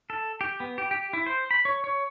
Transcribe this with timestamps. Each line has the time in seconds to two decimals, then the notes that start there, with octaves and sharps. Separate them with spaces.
0.10 A4
0.41 G4
0.60 B3
0.78 G4
0.91 G4
1.13 E4
1.26 C5
1.51 B5
1.65 C#5
1.84 C#5